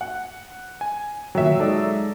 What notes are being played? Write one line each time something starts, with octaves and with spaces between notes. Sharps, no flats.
F#5
G#5
A#2 D3 D#3 F#3 E5 G5
G#3 D#4 A4 D5 D#5